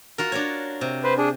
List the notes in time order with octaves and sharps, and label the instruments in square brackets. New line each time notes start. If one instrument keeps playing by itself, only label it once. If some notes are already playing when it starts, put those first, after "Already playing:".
[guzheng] F4 F#4 A#4
D4 A#4 C#5
C3
[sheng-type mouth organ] B4 C5
D4 G#4